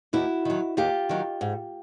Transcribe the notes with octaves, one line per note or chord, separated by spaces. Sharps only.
D#2 E4 F#4
D#3 F#3
D#2 F4 G4
D#3 F#3
G#2